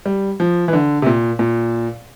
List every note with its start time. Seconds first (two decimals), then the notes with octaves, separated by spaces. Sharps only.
0.06 G3
0.40 F3
0.68 E3
0.73 D3
1.02 C3
1.06 A#2
1.39 A#2